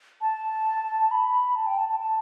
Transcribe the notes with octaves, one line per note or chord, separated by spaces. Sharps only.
A5
B5
A5
G5
A5
A5
A5